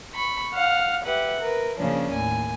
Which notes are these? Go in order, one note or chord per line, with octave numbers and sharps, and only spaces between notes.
B5 C#6
F5 F#5 F6
G4 B4 E5 F#5
A#4 B4
C#3 F3 A#3 C#4 D4
D#2 A2 G#5